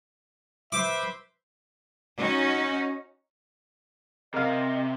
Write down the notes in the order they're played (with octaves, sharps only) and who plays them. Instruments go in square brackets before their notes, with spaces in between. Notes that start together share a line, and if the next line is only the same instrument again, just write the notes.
[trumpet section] B4 C5 E5 [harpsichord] D6
[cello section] C#4 D#4 F#4
[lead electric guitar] C3 [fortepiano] A#4 F5 [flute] D#5